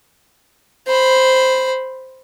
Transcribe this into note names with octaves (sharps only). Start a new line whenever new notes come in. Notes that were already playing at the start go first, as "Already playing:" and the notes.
C5 B5